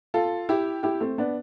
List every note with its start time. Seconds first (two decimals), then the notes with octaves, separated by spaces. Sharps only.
0.14 F4 A4
0.49 E4 G4
0.83 E4 G4
1.00 A3 C4
1.18 B3 D4